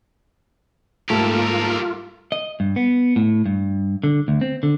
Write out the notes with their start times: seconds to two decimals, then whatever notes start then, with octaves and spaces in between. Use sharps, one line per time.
1.10 G#2 G3 A3 A#3 F4 G4 A4 A#4
2.32 D#5
2.60 G2
2.76 B3
3.16 A2
3.46 G2
4.04 D3
4.28 D2
4.41 C4
4.63 D3